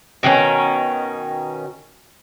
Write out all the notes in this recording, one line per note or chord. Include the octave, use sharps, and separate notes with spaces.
B2 D#3 A#3 C#4